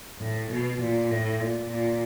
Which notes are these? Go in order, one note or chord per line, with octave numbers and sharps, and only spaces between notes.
A2
B2
A#2
A2
A#2
A#2